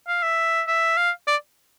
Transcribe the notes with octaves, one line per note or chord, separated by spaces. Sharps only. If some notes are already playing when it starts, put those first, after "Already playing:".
F5
E5
E5
F5
D5